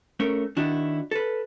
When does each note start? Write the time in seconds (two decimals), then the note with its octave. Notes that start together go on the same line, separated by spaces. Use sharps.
0.20 A3 C#4 A#4
0.57 D#3 D4 E4 F#4
1.11 A4 B4